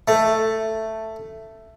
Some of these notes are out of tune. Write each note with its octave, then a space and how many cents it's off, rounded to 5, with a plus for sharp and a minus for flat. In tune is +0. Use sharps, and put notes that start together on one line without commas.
A3 +5